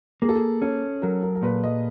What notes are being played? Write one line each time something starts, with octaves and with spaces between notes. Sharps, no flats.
A#3 G#4
A4
G#4
C#4 A4
F#3 A#4
A#4
A#4
A#2 B4
D#5